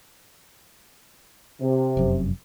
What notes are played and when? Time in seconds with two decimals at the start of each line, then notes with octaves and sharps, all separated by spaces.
1.61 C3
1.97 F1 F#2